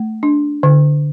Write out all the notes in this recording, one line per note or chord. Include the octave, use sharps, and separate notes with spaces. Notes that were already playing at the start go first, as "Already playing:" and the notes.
Already playing: A3
D4
D3